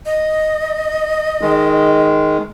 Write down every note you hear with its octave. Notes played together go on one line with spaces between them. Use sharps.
D#5
D#3 G#3